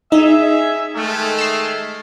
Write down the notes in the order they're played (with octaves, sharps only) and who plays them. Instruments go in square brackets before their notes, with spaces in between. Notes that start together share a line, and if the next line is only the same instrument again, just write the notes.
[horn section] C#4 G#4 E5 [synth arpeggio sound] D#4
[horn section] D#3 G#3 A3
[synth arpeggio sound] C7 E7